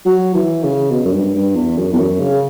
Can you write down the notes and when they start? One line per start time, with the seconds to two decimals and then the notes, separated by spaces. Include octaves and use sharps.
0.05 F#3
0.35 E3
0.63 C#3
0.91 B2
1.05 F#2
1.13 G2
1.34 G2
1.55 E2
1.77 F#2
1.93 E2
1.99 F#2
2.20 C#3